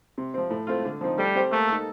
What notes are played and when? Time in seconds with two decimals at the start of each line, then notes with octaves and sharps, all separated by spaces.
0.18 C3
0.34 F3 C4
0.50 A2
0.67 A3 C4 F4
0.85 D3
1.01 F3 C4 D#4
1.18 G3 A3
1.35 C4 G4 C5
1.51 A3 A#3
1.68 D#4 A4